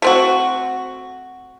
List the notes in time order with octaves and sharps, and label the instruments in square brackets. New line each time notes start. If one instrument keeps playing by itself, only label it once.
[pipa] A3 C4 F#4